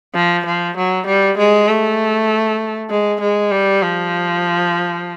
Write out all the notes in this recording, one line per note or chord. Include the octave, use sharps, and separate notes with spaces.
F3
F3
F#3
G3
G#3
A3
G#3
G#3
G3
F3